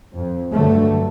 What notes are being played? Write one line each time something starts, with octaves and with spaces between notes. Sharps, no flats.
F2
G2 D3 F#3 A3